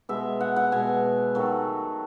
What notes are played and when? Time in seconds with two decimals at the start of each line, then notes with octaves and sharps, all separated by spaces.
0.09 B2 G#3 E5
0.41 F#5
0.56 F#5
0.72 B2 G#3 G#5
1.35 D#3 F#3 A3